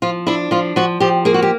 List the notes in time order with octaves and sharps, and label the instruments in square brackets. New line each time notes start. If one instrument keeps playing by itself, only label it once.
[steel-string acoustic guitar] F3 F4
D4 E4
F3 F4
F3 F#4
F3 G4
A#3 G#4
F#4
G4